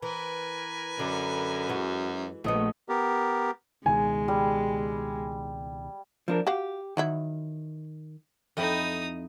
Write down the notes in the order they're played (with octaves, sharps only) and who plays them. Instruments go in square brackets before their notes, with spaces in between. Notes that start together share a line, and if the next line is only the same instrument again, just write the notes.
[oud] E3 [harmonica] A#4 B4 G#5
[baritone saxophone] F#2 [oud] D3 [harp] D5
[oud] E3 G#3 F#4
[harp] A#1 D#5 C#7 [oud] A3 B3
[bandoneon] B3 G4 A#4
[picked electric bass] C#2 B2 D#3 [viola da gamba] G#3 [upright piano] G#5
[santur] G3
[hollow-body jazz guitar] F3 D4 A#4
[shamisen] F#4 F5 [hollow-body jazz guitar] G4
[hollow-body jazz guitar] D#3 [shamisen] E3 F#3 E4
[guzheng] F2 E4 G5 [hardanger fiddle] D#4 D#6